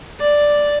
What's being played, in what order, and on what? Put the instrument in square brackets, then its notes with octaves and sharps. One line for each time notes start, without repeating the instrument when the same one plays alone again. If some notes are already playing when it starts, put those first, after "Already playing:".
[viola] D5